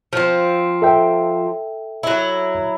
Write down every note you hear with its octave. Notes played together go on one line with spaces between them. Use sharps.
F3 C4
A4 E5 G5
F#3 E4